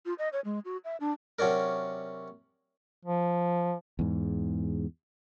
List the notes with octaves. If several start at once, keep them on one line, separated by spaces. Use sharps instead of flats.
F4
D#5
C#5
G#3
F#4
E5
D4
C3 F#3 C#4 D4 A#4
F3
E2 G#2